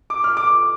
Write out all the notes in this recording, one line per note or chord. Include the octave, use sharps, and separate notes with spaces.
D6
F6
D6